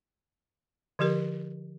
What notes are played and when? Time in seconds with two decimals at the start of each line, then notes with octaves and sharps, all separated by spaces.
0.99 D3 F3 G4 A#4